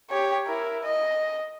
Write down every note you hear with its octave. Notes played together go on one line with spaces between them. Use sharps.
G4 C#5
E4 A#4
D#5